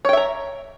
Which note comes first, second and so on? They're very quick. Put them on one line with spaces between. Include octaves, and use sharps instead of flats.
C#5 G5 E5 A#5